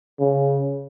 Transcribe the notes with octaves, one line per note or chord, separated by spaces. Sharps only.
C#3